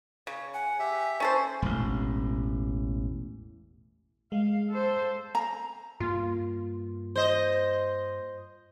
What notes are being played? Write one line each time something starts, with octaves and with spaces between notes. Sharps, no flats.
C#3 C#5
F#5 G#5
G4 E5
C#4 A4 C5
E1 A1
G#3 F5
A4 C5
A#5
G2 A#3 F4
C5 D#5